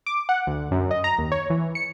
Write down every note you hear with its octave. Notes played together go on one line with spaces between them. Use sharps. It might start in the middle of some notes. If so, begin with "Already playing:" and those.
D6
F#5
D2
F#2
D#5
A#5
D#2
C#5
E3
C#7